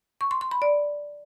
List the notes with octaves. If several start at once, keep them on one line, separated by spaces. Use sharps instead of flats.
C#6
C6
C6
B5
D5